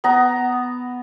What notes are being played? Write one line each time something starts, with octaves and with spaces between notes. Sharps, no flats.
B3 A#5